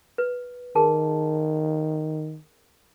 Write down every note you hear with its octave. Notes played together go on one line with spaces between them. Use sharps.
B4
D#3 G#4 A#4 A5